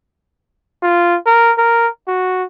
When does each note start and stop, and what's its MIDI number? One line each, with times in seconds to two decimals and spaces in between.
0.82 1.17 65
1.26 1.52 70
1.57 1.88 70
2.08 2.44 66